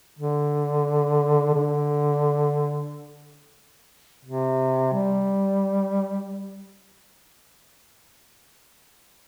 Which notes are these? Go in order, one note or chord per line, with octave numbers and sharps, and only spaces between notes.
D3
D3
C3
G3